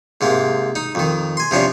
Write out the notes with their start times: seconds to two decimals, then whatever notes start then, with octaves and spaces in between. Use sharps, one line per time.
0.21 G#2 C3 A#3
0.75 D#4
0.95 F2 D#3
1.37 G#5 C6
1.51 C3 F3 C#4 D4